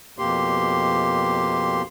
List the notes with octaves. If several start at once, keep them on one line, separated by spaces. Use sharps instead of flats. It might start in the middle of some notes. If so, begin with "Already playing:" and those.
F2 B2 A#3 G4 C6